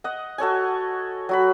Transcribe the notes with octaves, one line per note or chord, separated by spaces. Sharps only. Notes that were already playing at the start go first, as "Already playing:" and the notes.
D#5 F#5
F#4 A4 C#5 G#5
F#3 F#4 B5